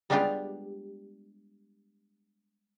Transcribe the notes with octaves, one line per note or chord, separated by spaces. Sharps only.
G3 G#3 B3 D4 F4 G4